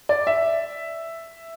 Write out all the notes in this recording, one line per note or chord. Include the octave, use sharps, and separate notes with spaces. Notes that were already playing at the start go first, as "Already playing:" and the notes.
D5
E5